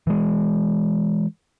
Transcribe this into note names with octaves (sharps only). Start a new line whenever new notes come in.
E3 G#3